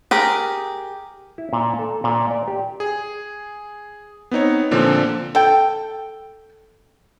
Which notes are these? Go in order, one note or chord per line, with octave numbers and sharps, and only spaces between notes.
G4 G#4 A#4
E4
A#2
A4
A#2
D5
G4
G#4
B3 C4 D#4 C#5
A#2 D3 F3 A#3 C4
A4 G5